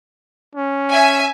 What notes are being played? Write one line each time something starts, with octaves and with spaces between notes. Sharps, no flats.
C#4
E5 G#5